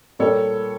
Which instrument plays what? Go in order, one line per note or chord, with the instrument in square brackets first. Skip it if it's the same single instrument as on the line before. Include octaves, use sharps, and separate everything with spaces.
[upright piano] A#2 G3 A#3 D4 [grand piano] A4 C#5